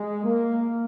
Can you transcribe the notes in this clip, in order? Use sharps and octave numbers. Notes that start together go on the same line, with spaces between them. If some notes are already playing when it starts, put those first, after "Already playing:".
Already playing: G#3
A#3